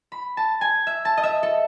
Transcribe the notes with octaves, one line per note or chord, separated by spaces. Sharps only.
B5
A5
G#5
E5
A5
D#5
E5
A4